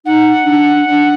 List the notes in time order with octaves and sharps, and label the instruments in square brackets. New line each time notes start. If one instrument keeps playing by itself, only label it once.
[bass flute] D#4 [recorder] F#5
[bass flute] D4
D4